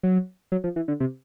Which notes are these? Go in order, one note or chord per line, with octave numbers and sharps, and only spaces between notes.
F#3
F#3
F3
E3
D3
C3